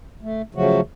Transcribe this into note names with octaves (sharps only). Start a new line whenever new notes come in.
A3
C#3 F3 F#3 A3 F#4